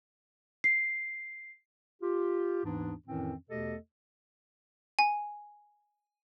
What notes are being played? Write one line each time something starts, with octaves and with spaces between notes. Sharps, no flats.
C7
F4 G4
D#2 G#2 E3 B3 D4
F2 A2 D#3 E3 C4 C#4
E2 B2 A3 G4 A4 D#5
G#5